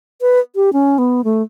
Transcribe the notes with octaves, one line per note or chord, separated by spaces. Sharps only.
B4
G4
C#4
B3
A3